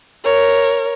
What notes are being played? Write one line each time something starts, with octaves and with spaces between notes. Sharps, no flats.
A#4 C#5